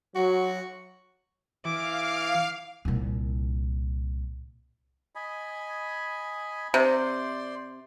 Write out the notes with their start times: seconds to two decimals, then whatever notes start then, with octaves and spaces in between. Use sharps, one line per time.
0.15 F#3 F#4
1.65 E3 F5 D6
2.85 C2 A#2
5.15 D#5 G#5 B5
6.74 C3 C5 D5 C6